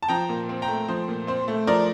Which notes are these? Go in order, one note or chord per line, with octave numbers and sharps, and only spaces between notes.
A5
F3 G5 A#5
A#2
C4
G5 A#5
A3
F3 C5
A#2
C4 C5
A3
F3 A#4 D5